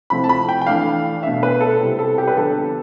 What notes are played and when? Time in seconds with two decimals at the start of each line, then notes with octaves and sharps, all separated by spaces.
0.10 C3 F3 A3 C4 E4 B5
0.24 A5
0.29 B5
0.49 G5
0.61 G5
0.67 E3 A3 D4 F5
1.23 B2 A3 D4 E5
1.43 B4
1.61 A4
1.80 C3 G3 C4 E4
1.99 A4
2.18 G4
2.28 B4
2.36 D3 F3 B3 D4 A4